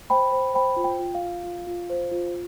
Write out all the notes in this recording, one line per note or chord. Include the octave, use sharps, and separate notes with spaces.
C5 G5 B5
C5
C5 G5 B5
F4
G5
F4
F5
F4
F4
F4
C5
F4